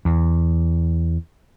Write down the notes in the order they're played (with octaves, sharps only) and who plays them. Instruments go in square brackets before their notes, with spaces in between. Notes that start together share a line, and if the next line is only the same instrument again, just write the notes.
[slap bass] E2